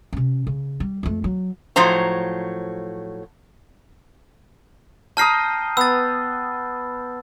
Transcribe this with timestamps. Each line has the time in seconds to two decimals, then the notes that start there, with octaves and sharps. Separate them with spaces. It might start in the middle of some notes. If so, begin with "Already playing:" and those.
0.13 C3 C#4
0.47 C#3
0.80 G3
1.03 F2 A3
1.24 F#3
1.76 A2 F3 F#3 C5 A#5
5.17 G5 A5 A#5 D#6 F6 C7
5.77 B3 E6 A6